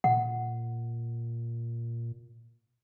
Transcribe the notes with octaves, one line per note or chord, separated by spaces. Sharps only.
A#2 F#5